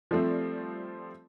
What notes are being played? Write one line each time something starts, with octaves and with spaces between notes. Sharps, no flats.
F3 G3 A3 C4